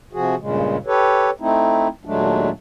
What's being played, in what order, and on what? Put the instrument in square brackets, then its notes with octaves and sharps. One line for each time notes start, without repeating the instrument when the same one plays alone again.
[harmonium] C3 F3 F#4 G#4
G2 A#2 C#3 G#3
G4 A4 B4 C#5
A3 C4 D#4 E4
D#2 A#2 F#3 G#3 A3 D4